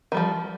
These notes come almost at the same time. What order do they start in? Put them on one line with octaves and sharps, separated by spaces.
D#3 G3 F3